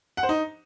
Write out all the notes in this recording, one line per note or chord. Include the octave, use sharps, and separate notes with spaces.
F#5
C5
D#4